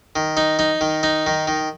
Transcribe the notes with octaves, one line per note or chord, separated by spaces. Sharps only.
D#3
D#4
D#4
D#3
D#4
D#3
D#3